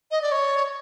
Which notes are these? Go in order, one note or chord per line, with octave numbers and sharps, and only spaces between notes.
D#5
D5
C#5